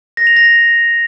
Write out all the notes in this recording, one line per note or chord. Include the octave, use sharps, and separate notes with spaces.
A#6
F7
A#6